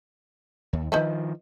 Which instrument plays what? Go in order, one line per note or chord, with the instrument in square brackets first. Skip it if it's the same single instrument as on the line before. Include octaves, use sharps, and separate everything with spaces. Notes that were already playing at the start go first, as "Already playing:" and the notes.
[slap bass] D#2
[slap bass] D#3 F3 [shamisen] D#4 B4 E5